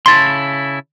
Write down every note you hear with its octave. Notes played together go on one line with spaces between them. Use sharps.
C#3 E4 A5 C6